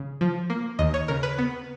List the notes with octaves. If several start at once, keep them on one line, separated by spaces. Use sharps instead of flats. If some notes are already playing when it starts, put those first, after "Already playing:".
Already playing: C#3
F3
A#3
D#2 D#5
C#5
C#3 A#4
B4
B3